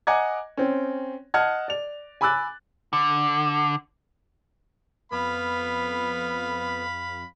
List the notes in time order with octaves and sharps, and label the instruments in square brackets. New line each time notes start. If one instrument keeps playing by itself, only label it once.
[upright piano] D#5 F#5 G#5 A#5 D6 G#6
C4 C#4
D#5 F#5 A5 F6 G#6
D5 F7
G#5 B5 D6 E6 F#6 A6
[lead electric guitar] D3
[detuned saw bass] F2 [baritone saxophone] B3 [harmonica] F5 B5